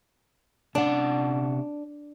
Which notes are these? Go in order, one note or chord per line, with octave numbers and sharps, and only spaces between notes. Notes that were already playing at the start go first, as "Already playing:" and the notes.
C3 C#4 D4 F#5